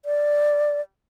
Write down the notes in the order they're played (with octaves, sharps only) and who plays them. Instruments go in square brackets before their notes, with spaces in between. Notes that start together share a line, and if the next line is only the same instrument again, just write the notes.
[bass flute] D5